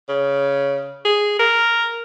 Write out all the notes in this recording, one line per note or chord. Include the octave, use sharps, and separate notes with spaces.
C#3
G#4
A#4